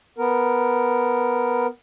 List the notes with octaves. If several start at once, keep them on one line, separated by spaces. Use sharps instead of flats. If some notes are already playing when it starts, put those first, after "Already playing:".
B3 A#4